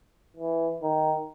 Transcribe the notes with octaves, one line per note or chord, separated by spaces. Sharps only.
E3
D#3